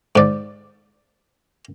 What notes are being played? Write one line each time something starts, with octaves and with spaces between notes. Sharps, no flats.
G#2 D5